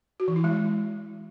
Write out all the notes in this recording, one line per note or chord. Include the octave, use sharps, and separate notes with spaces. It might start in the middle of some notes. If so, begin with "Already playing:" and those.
F#4
E3
E4
G#3